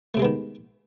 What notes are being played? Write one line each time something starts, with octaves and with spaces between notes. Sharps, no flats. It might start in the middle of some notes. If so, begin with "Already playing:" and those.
C3 D#3 G#3 A3 B3